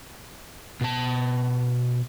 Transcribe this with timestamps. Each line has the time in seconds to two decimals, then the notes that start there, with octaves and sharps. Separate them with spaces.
0.81 B2 A5